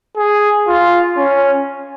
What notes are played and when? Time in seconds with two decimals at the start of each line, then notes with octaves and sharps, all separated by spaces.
0.17 G#4
0.67 F4
1.17 C#4